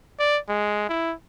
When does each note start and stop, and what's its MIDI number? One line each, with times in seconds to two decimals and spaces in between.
0.19 0.39 74
0.49 0.87 56
0.89 1.13 64